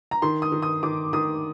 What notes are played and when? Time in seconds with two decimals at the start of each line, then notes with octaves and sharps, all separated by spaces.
0.11 A#5
0.22 D#3 C6
0.42 D#6
0.52 D#3
0.62 D#6
0.83 D#3 D6
1.13 D#3 D#6